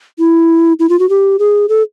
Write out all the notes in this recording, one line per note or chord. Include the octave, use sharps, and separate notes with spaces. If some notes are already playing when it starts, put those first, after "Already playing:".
E4
E4
F4
F#4
G4
G#4
A4